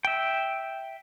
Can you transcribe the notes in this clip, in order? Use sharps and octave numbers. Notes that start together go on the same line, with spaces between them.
E5 G5